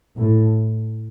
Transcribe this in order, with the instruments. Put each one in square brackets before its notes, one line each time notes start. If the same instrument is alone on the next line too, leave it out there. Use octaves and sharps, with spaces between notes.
[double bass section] A2